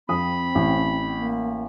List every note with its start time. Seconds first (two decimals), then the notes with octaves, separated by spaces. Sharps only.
0.09 F2 C4 B5 D#6
0.55 A1
1.19 A#3